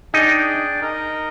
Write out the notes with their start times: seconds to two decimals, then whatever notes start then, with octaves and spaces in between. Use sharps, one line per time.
0.14 D4 D#4 G#4 D5 G5
0.80 D#4 A#4 D#5